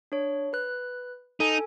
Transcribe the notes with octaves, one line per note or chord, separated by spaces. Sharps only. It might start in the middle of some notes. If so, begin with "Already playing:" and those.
D4 C#5
B4 F#6
D#4 A4 G#5